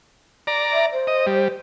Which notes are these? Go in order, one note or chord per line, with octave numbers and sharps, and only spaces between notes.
D5 A#5
E5
C5
D#5
G3